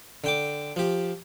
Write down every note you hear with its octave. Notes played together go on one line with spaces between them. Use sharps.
D3 G5 D6
F3 G4